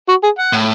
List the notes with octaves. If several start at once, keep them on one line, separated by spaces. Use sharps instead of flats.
F#4
G#4
F#5
A2